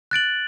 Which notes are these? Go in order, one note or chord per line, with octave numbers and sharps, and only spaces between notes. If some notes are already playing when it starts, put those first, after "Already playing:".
F#6 A6 D7 F#7